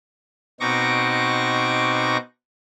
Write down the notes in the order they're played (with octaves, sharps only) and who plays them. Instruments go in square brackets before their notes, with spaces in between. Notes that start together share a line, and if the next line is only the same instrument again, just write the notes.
[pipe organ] B2 C4 D#4 C#6 D6 A#6